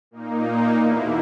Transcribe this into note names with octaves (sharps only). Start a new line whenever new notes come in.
A#2 A#3 D#4
E2 B2 A#3 E4